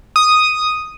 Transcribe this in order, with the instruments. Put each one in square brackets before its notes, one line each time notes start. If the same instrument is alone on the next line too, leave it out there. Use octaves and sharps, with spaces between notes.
[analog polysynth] D#6